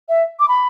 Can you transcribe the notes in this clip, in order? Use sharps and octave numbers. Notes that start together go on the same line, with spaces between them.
E5
D6
B5